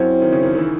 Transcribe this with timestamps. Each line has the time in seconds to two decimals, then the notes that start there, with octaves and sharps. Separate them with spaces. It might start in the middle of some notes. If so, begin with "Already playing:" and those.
Already playing: F#2 F#3 C4 E4 C5
0.22 D#3
0.32 C#3
0.43 D#3
0.55 D#3
0.58 E3